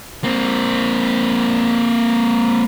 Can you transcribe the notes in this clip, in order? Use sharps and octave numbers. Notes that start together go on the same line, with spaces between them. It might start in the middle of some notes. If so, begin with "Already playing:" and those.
A#3 C4